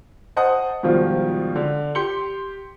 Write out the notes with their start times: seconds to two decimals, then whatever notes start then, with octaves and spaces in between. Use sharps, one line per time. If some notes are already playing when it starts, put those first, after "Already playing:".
0.36 C5 D#5 F#5 A5 D#6
0.83 G#2 B2 D#3 F3 G3 F4
1.56 D3
1.95 G4 C6 C#7 G7